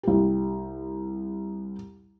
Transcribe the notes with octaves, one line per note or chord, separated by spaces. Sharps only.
C2 G4